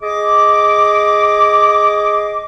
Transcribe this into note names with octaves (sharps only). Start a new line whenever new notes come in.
G#4 D#5 D6